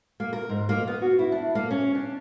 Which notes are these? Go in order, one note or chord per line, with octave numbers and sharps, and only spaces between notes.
A#3
A#4
G#2
A#3
B3
F#4
E4
D4
A#3
C#4
D4